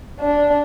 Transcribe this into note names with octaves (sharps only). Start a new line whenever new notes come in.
D4